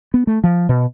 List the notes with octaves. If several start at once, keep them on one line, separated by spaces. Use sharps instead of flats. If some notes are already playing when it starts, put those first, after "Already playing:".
B3
A3
F3
B2